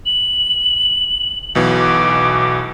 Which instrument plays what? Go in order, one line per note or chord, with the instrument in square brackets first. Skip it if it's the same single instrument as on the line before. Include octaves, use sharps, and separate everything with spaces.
[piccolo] F#7
[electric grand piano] B1 B2 E3
[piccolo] D6